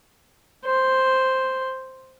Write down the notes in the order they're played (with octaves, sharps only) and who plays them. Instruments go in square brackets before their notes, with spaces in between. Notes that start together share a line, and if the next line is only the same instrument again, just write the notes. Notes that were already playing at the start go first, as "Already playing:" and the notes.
[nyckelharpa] C5